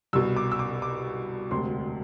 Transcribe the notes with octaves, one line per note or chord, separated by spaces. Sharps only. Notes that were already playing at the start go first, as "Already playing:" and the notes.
C2 B2 E6
D6
E6
D6
D6
E1 D2 C3 C6